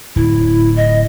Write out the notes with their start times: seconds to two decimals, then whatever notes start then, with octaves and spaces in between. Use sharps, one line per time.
0.16 D1 E4
0.76 D#5